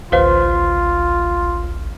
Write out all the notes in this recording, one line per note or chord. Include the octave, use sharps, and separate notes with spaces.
A1 D2 F4 B4 C5 F5